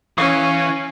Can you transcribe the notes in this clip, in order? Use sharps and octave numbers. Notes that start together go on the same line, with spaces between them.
E3 C#4 F5 C#6 D#6